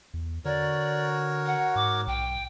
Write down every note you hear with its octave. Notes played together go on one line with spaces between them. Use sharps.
E2
D3 F#4 A#4 C#5 D5
F#5
G#2 D6
B1 G5